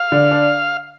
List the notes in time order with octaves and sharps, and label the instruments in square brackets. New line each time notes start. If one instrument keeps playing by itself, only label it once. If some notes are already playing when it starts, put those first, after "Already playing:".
Already playing: [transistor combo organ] F5
[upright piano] D3
D4